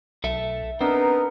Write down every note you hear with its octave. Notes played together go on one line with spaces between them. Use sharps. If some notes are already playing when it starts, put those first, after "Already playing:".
B1 A4 E5
B3 C4 D4 D#4 A#4